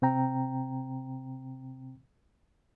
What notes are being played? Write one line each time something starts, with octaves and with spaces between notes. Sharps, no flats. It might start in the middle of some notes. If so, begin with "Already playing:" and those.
C3 C4 G5 A#5